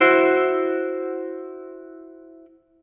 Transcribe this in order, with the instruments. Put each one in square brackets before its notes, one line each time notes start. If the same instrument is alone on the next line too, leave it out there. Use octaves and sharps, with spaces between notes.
[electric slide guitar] E4 F#4 C5